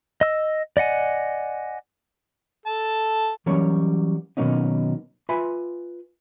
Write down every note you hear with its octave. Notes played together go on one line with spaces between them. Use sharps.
D#5 E6
D5 D#5 F#5 G#5
A4 A5
E3 F#3 G3 A#3 C#4 C#5
B2 D#3 F#3 A#3 C#4 D#4
F4 B4 E5 G#5 B5 C6